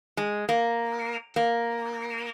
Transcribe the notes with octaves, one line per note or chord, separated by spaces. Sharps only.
G#3
A#3
A#3